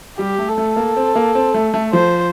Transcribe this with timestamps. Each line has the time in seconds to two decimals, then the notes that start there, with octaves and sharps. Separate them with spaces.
0.19 G3 G4
0.38 A3
0.49 A4
0.58 A3
0.76 A#3
0.97 C4
1.16 A#3
1.35 C4
1.54 A3
1.74 A3
1.93 F3 C5